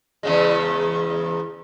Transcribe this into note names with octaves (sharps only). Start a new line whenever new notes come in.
E2 C#3 G#3